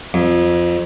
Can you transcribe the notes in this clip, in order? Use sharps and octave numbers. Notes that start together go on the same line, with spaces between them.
F2